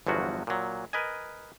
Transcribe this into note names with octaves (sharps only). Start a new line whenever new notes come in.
G1 E2 F3 F#3 F#4
A#2 F#3
A#4 B4 D#5 G#5